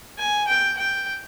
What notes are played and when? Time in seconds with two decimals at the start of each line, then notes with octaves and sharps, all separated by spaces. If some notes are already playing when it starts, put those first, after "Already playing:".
0.19 G#5
0.47 G5
0.77 G5